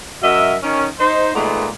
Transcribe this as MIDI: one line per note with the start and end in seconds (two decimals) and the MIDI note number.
0.22 0.55 42
0.22 0.55 66
0.22 0.55 70
0.22 0.55 75
0.22 0.55 76
0.63 0.86 51
0.63 0.86 61
0.98 1.30 63
0.98 1.30 72
1.34 1.68 46
1.34 1.68 51
1.34 1.68 56
1.34 1.68 57
1.34 1.68 59